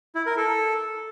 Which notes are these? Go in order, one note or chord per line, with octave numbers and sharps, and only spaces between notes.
E4
A#4
A4